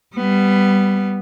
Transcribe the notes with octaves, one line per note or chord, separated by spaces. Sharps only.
G3 B3